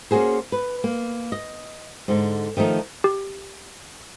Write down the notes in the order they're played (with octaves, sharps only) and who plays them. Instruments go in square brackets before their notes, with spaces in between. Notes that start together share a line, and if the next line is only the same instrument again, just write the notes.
[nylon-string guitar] A#3 C#4 D#4 F#4 G#4 C5
B4
A#3
D#5
G#2 D3
D#3 F3 A3 D#4
[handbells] G4